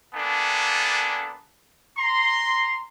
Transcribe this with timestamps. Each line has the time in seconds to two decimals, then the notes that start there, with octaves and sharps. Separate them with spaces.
0.14 A#3 B3 D4 A4 G#5
1.97 A#5 C6